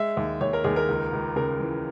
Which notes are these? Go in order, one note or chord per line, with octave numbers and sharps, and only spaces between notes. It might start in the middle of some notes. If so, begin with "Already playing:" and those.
Already playing: G#3 E5
D#2
D#2 C#5
A#4
D#2 G#4
A#4
C#2
C#2
C#3 A#4
E3